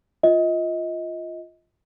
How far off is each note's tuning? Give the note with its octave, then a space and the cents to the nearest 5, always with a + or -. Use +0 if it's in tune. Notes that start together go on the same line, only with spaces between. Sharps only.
F4 +0 D#5 +25